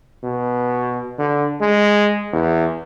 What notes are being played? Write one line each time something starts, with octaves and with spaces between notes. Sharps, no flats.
B2
D3
G#3
E2